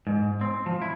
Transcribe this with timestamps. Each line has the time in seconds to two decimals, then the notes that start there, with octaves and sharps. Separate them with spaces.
0.07 G#2
0.41 C4
0.66 F3
0.82 E4